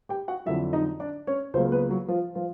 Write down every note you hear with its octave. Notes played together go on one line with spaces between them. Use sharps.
G4 G5
F#4 F#5
F2 D3 F#3 E4 E5
D#4 D#5
D4 D5
C#4 C#5
C#2 C#3 F#3 A#3 C4 C5
B3 B4
F#3 F#4
F3 F4
F3 F4